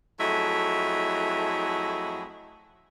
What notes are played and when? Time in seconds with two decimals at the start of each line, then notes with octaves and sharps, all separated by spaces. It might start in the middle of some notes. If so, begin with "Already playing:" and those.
0.20 F2 F#3 A3 E4 G#4 D#5